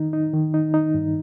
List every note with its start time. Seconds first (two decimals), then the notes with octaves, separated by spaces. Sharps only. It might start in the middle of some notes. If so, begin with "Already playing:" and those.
Already playing: D#3 D#4
0.13 D#4
0.34 D#3
0.54 D#4
0.74 D#4
0.94 G2